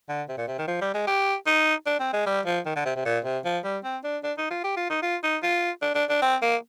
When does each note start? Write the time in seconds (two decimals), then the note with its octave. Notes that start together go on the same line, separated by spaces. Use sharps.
0.09 D3
0.29 C3
0.38 A#2
0.47 C3
0.58 D#3
0.68 F3
0.81 G3
0.94 G#3
1.07 G4
1.47 D#4
1.86 D4
2.00 C4
2.13 G#3
2.26 G3
2.46 F3
2.66 D#3
2.76 D3
2.85 C3
2.96 C3
3.05 A#2
3.25 C3
3.45 F3
3.64 G3
3.84 C4
4.04 D4
4.23 D4
4.38 D#4
4.50 F4
4.64 G4
4.77 F4
4.90 D#4
5.03 F4
5.24 D#4
5.43 F4
5.82 D4
5.95 D4
6.09 D4
6.22 C4
6.42 A#3